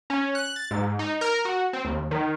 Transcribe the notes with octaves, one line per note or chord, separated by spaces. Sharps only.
C#4
F#6
A6
G#2
D#4
A#4
F#4
C4
D#2
D#3